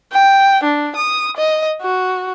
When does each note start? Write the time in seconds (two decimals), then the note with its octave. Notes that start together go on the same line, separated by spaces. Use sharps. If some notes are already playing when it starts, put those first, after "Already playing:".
0.13 G5
0.64 D4
0.96 D#6
1.37 D#5
1.82 F#4